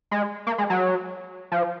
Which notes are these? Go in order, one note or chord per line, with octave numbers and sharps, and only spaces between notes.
G#3
A#3
G#3
F#3
F3